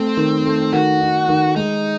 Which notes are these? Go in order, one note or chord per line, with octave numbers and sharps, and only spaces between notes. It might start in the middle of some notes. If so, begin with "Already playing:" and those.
Already playing: A3 C4
D#3
A3
D#3 F#4
D#4
D#3
G#3 D#4